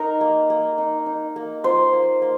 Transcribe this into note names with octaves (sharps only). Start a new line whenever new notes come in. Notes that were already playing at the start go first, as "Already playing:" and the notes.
Already playing: D#4 A#4
A#3
A#3
D#4
D#4
A#3
F4 C5
A#3
A#3